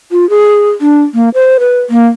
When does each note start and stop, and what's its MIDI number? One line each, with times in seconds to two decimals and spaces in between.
0.12 0.28 65
0.30 0.70 68
0.81 1.02 62
1.14 1.29 58
1.34 1.58 72
1.60 1.80 71
1.90 2.06 58